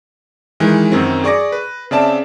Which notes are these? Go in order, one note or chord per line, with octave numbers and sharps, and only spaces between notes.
D#3 E3 G#3
F#2 D#3 F#3 C4
G#4 D5 C#6 D6 A#6
B4
C#3 C4 D5 E5 A5 E7